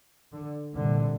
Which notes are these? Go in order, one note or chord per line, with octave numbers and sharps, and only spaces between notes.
D3
C2 A#2 D3